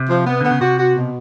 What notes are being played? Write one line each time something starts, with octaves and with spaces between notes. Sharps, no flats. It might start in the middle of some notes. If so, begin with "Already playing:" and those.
Already playing: C3
F3
B3
D3 B3
C#3
C3 F#4
F#4
B2